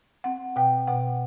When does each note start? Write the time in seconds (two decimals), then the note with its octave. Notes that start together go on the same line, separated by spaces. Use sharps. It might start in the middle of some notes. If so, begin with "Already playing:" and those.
0.24 C4 F#5
0.56 B2 G5
0.87 B2 F#5